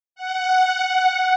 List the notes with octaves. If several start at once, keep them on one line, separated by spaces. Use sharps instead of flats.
F#5